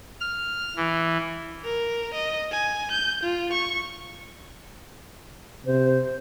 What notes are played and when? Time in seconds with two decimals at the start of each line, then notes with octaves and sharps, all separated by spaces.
0.20 F6
0.76 E3
1.64 A#4
2.14 D#5
2.51 G#5
2.91 G6
3.23 F4
3.52 C#6
5.66 C3 C5